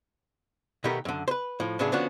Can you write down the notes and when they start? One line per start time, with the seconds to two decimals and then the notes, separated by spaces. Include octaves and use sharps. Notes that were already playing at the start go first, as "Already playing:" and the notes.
0.84 B2 D#3 A3 B3 G4 A#4
1.05 F#2 D3
1.28 B4 C5
1.60 A2 F3
1.79 A2 C#3 F#3 B3 D4 G#4
1.92 D3 F3 B3 C#4 D4 F#4